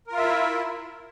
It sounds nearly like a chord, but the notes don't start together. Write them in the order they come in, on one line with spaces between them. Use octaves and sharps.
A#4 F4 E5 E4